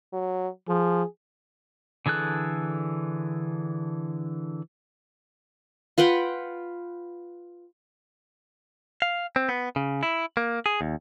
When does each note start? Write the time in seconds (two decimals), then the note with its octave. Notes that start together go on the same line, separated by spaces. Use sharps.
0.13 F#3
0.68 F3 G#4
2.06 D3 E3 G#4 A4 F#6
5.98 F4 B4 F#5 G5
9.02 F5
9.36 C4
9.49 B3
9.76 C#3
10.03 E4
10.37 A#3
10.66 G#4
10.81 D#2